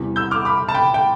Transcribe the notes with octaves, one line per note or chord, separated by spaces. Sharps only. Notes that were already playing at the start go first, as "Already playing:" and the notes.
Already playing: E2 C3 E3 G3
E6 G6
D6 F6
B5 D6
A5
G5 B5
G5